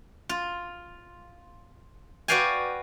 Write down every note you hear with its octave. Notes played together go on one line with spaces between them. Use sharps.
F4
F#4 B4 D5 F5 G5 G#5